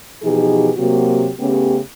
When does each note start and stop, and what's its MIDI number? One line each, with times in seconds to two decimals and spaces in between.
0.22 0.71 47
0.22 0.71 52
0.22 0.71 53
0.22 0.71 63
0.22 0.71 67
0.22 0.71 68
0.77 1.30 48
0.77 1.30 54
0.77 1.30 58
0.77 1.30 66
0.77 1.30 67
1.38 1.78 49
1.38 1.78 57
1.38 1.78 59
1.38 1.78 61
1.38 1.78 67